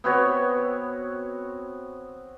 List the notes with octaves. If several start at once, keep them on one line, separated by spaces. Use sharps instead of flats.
B3 C4 F#4 C#5